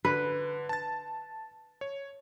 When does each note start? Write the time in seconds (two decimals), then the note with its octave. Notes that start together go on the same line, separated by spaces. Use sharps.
0.05 D3 B4
0.69 A5 A6
1.81 C#5